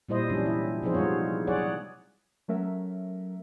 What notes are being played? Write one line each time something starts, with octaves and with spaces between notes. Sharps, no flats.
A#2 G3 E4 C5 D#5
C3 E3 F#3 G3 C#4 D4
E4
C3 F3 B3 D#4 G#4 C5
G3 G#3 D#4 F4 C#5
F#3 G#4 C#5 D5 F#5
F#3 A3 C#4 A#4 E5